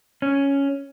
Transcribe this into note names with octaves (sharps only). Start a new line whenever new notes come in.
C#4